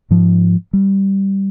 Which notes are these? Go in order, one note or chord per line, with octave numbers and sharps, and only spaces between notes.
G#2 F3
G3